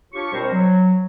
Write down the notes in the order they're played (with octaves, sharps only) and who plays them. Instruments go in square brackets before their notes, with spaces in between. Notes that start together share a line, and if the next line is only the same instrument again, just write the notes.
[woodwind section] D4 F4 G4 C#5 C#6
B2 G3 C4 A#4 C5
F#3